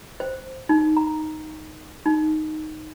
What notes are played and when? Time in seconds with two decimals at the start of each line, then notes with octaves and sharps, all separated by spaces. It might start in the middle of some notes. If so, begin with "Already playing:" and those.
0.20 C5
0.69 D#4
0.97 A#5
2.06 D#4